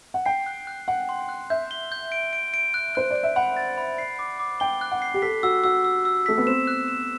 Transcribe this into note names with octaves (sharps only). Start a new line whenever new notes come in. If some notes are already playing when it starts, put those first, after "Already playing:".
F#5
G5 C7
F#6
F#6
F#5 F#6
C6
F#6
E5 G6
G7
G6
D7
D7
D7
F#6
C5 F#6
D5
F#6
E5
F#5 B5
A6
B5
C7
D6
D6
G5 G7
F#6
F#5
C7
G4
A4 B6
F#4 E6
F#4 E6
E6
E6
A3 B6
B3
C4 E7
F#6
E7